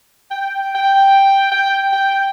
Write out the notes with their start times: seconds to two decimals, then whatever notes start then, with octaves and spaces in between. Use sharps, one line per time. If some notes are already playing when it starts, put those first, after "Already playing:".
0.31 G5
0.75 G5
1.52 G5
1.93 G5